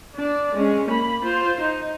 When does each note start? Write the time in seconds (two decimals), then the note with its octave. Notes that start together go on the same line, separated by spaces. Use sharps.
0.15 D4 D5
0.55 G#3 C#4
0.88 A#3 B5
1.25 F4 C5
1.60 D#4